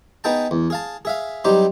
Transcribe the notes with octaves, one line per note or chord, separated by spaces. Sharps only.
B3 D#4 G#4 G5 A5
E2
G#4 F5 A5
G#4 E5 F5
F#3 G3 C4 D#4 G4